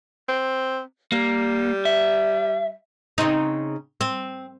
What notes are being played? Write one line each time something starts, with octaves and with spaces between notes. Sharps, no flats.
C4
G3 A#3
E5
C#3 C4 D#4
C4